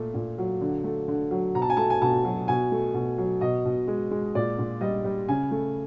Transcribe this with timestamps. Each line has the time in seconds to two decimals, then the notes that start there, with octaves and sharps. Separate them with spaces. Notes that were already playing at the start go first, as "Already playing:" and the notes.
Already playing: A#2 A3
0.14 A#2
0.38 F#3
0.61 D3
0.84 A3
1.08 D3
1.31 F#3
1.55 B2 A#5
1.62 A5
1.70 G#5
1.77 A3 A5
1.90 G#5
2.02 B2 A5
2.25 F#3
2.48 B2 G#5
2.72 A3
2.94 B2
3.18 F#3
3.41 B2 D#5
3.65 B2
3.87 G#3
4.11 G#3
4.35 A#2 D5
4.59 A#2
4.81 G3 D#5
5.04 G3
5.28 C#3 G#5
5.51 A3